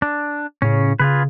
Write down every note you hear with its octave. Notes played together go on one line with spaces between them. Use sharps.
D4
A2 C#3 C#4
C#3 F4 G#4 B4